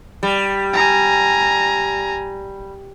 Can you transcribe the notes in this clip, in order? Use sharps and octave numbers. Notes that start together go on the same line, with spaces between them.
G3
G#5 A#5